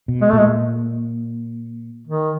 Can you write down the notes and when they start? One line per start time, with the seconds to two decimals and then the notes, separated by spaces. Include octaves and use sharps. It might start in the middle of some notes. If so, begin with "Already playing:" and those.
0.08 B2
0.21 G#3
0.29 A3
0.33 A#2 G#3
2.07 D#3